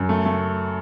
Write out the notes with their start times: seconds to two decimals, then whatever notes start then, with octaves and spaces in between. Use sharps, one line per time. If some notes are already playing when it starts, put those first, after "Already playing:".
Already playing: F#2
0.09 A3
0.26 A3